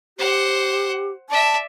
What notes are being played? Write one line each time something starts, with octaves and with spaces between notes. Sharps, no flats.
G4 C5 F#5
D5 E5 A5